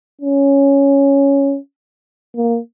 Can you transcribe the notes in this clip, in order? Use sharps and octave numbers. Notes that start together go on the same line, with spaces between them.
C#4
A#3